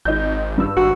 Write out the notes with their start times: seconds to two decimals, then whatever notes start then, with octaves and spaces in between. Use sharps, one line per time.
0.05 G#1 D#4 D#5 G6
0.58 G2 E6
0.77 G#1 F#4